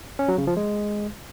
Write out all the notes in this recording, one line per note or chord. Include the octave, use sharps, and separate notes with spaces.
C#4
F#3
C#3
F3
G#3